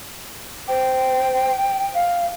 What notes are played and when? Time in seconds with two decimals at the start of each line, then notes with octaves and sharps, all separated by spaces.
0.68 C5 G5
1.94 F5